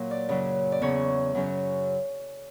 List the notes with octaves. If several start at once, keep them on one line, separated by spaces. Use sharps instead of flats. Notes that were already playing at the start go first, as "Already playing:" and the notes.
Already playing: A#2 F#3
D5
F#2 C#3 F#3
D5
E2 C#3 F#3 C#5
F#2 C#3 F#3